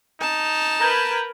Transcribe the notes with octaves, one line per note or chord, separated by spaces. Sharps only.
D#4 A5
A#4 B4 A#5 B5 G6 G#6